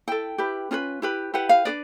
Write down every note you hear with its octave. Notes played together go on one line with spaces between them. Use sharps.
E4 A4 G5
E4 G4 B4
C#4 F4 G#4 B4
E4 G4 B4
E4 G4 B4 F#5
F5
D4 G4 B4 D5